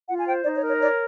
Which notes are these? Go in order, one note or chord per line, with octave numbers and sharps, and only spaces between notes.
F4 F#5
G#5
C5 G5
D#4 D5
C#5
A#4
C#5
C#5 D5